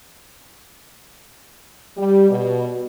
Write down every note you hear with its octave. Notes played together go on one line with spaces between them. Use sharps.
G3
B2